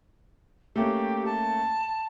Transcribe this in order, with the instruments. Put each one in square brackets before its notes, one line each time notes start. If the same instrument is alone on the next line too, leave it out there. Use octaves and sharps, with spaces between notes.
[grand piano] A3 A#3 C#4 [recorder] G4
[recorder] A5